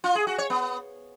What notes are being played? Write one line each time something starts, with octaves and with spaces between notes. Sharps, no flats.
F4
G#4
F#4
C#5
B3